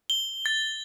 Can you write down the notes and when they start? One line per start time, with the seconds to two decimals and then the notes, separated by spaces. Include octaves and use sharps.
0.10 G7
0.46 A6